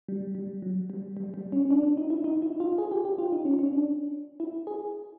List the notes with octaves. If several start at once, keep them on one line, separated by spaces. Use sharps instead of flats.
G3
G3
F#3
G3
G3
G3
C#4
C#4
D4
D4
D#4
E4
D#4
E4
F4
G#4
G4
G4
F4
D#4
C#4
C#4
D4
E4
G#4